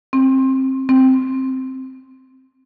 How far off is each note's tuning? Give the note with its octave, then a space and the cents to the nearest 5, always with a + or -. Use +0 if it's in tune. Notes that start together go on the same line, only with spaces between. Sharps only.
C4 +20
C4 +0